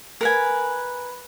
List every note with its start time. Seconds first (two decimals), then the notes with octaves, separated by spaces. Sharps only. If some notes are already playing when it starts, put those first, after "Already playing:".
0.21 A#4 B4 G#5